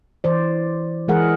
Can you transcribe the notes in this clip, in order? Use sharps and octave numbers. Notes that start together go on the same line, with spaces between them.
E3 C5 D5
E3 G#3 G#4 A#4 F#5